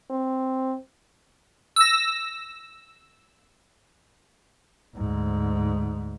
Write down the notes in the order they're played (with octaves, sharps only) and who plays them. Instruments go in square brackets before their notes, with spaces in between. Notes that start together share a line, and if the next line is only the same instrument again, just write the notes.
[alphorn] C4
[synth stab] E6 A#6
[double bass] D2 G#2